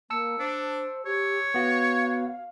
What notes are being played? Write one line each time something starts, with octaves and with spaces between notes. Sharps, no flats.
A#3 A5 E6 C#7
D4 C5
G4 C#5
B3 F#4 F5